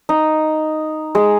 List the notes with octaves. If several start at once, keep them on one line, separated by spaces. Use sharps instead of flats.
D#4
G#3